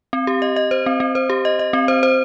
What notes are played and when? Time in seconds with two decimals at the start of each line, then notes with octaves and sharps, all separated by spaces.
0.13 C4
0.27 G4
0.42 D#5
0.56 D#5
0.71 C5
0.86 C4
1.00 C4
1.15 C5
1.30 G4
1.45 D#5
1.59 D#5
1.73 C4
1.88 C5
2.03 C5